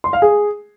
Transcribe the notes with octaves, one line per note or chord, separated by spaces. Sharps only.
C6
F5
G#4